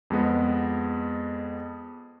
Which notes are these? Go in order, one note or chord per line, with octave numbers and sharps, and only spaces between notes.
F2 G#3 B3